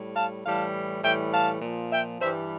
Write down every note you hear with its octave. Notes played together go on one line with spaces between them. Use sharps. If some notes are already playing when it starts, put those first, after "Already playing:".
Already playing: A2 G3
F5 A5
A2 E3 G3 F5 A5
A2 E3 G3 E5 G5
F5 A5
A#2 F3
E5 G5
G2 E3 G3 C5 E5